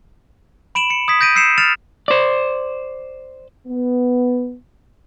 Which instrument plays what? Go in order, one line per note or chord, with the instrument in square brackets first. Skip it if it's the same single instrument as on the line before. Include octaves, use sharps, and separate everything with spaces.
[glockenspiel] B5 D7 E7 F#7
C#7
D#6 G#6 B6
G6 A#6 D7 D#7
E6 G6 C7 C#7 E7
F6 A6 C#7 E7 F7
[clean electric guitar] C5 D5
[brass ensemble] B3